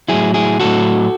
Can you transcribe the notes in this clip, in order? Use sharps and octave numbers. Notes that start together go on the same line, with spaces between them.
A2 F#3 E4 G#4
E4 G#4
A2 F#3 F#4 A4